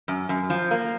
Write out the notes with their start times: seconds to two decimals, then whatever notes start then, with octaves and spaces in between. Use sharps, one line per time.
0.08 F#2
0.29 F#2
0.50 F3
0.71 A#3